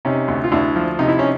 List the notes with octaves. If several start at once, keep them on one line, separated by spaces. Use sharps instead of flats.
C3 C#4 D#4
D2
F4
D2 D4 E4
F3
C3 D#4
E4
C#4 D#4